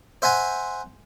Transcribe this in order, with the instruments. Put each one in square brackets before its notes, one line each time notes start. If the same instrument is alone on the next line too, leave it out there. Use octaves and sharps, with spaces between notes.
[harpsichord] C5 E5 F#5 G#5 A#5